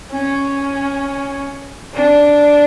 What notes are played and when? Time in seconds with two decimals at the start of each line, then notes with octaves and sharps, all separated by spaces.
0.11 C#4
1.94 D4